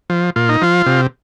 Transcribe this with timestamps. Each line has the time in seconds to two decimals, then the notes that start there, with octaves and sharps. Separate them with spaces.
0.10 F3
0.36 A#2 F4
0.49 D#4
0.62 F3 F4
0.86 C3